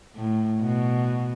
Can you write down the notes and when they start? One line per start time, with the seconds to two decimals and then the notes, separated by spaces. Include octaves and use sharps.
0.16 A2
0.60 B2